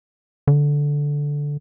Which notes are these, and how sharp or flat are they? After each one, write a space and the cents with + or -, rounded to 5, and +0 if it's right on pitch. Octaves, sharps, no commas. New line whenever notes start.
D3 -10